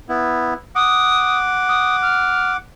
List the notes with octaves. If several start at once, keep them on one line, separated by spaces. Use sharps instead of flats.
B3 E4
F#5 D6 D#6
D#6
F6